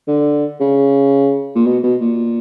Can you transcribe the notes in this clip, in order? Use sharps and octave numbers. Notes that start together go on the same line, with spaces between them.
D3
C#3
A#2
B2
B2
A#2